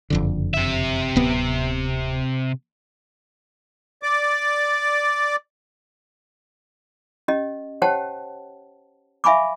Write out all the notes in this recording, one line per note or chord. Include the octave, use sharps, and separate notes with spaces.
F#1 F2 D3
C3 E5
D1 B3
D5 D6
C#4 G4 D#5
G4 C5 C#5 F#5 G5 A5
E5 F5 G#5 B5 C#6 D6